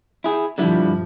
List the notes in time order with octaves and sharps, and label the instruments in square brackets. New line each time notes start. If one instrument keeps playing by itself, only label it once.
[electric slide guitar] E4 G#4
[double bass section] G2 B2 F3 [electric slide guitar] D3 G3 E4